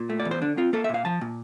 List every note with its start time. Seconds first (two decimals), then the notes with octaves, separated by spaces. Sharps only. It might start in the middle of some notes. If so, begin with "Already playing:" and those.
Already playing: A#2
0.10 A3
0.20 D5
0.25 E2
0.31 C5
0.42 D3 D4
0.57 C4 F4
0.73 A#3 A4
0.84 E5
0.89 A#2
0.94 F5
1.05 F3 A5
1.21 A#2